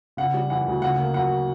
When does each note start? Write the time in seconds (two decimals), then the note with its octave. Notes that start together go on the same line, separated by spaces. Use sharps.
0.17 C#3 F#5
0.34 G3
0.50 E3 F#5
0.66 D2
0.82 C#3 F#5
0.98 A#3
1.14 F#3 F#5